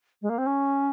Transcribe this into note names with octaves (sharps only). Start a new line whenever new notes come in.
G#3
A#3
C4
C#4